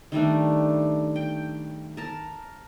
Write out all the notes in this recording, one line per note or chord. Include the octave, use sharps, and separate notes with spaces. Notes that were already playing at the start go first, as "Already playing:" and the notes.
D#3 G3 A3 D4
G5
A#4 A5